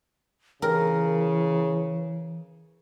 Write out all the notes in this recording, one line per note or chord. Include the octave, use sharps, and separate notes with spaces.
C#3 E3 A#4